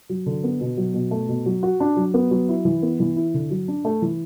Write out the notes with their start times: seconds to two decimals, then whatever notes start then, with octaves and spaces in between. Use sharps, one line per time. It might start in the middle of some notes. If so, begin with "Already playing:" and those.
0.10 F#3
0.26 D3
0.44 B3
0.61 B2
0.77 F#3
0.94 B2
1.11 A3
1.29 B2
1.46 F#3
1.63 F#4
1.80 D4
1.97 F#3
2.14 B3
2.31 F#3
2.49 E4
2.65 E3
2.82 B3
3.00 E3
3.16 E4
3.34 D3
3.51 F#3
3.68 D4
3.85 A3
4.02 E3